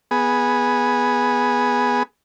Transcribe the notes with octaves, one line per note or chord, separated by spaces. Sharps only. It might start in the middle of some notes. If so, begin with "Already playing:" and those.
B3 G#4